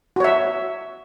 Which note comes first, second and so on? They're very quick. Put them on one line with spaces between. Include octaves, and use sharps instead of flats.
F#4 C#5 E5